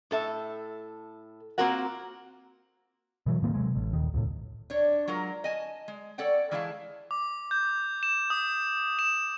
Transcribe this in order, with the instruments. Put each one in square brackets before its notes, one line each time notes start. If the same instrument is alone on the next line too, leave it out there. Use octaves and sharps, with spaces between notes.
[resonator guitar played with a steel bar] A2 A4 E5
A#3 C4 F4 F#4 A#4 F#5
[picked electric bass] B2 E3 F#3
A2 D#3 A#3 C4
C3 F#3 G#3
A1
D#1 D#3
C#2 A2
[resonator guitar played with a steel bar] D4 C#5
F#3 G#3 F4 A#4
D#5 G#5 A5
G#3
A4 C#5 D5 F#5 G5
E3 G#3 E4 G#4 F5 A5
[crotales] D6
G6
E7
D#6
E7